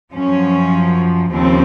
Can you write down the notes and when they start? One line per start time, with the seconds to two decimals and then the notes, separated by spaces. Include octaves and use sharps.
0.13 F#2 F3 C#4
1.31 D#2 C#3 F3 C4